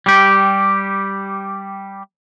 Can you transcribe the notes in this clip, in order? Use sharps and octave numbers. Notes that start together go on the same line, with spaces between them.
G3 G4